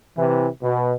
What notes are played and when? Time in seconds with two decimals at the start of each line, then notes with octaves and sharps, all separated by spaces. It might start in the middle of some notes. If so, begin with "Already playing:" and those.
0.17 C3 E3
0.63 B2